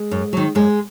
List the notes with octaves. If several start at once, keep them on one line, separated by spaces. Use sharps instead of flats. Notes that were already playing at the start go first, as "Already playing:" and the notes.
Already playing: G#3
F#2
D#3 F#3
F#2 G#3